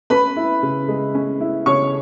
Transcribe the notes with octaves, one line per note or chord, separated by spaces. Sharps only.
C#4 B4 B5
E4
C#3
G#3
C#4
E4
C#3 C#5 C#6